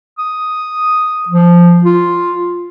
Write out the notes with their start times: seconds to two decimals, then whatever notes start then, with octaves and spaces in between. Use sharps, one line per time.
0.19 D#6
1.28 F3
1.84 F4